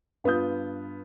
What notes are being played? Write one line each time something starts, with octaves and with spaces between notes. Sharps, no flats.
G2 B3 F4 D#6 G6